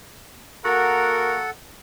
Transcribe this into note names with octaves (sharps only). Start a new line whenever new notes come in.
A#3 F#4 A4 A#4 F#5